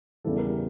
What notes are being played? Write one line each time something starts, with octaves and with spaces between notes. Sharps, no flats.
E2 C#3 E3 G3 A4
A#4
G4